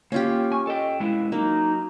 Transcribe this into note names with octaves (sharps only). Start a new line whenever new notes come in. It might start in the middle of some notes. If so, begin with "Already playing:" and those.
A#3 C#4 F4 G4 F5
G#5 C#6
A4 D#5 G5
G#3 B3 E4 F5
F#3 A#3 D#4